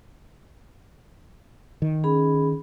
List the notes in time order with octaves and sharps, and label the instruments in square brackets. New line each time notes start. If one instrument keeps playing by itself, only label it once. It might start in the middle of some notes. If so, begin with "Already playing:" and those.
[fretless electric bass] D#3
[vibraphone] C#4 G#4 B5